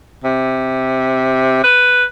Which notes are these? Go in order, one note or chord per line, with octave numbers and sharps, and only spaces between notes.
C3
B4